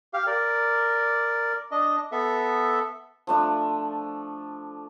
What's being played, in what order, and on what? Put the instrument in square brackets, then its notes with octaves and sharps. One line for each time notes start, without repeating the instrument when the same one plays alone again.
[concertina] G4 F5
A#4 D5
D4 D#5
B3 A4 E5
[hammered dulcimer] F3 A3 D4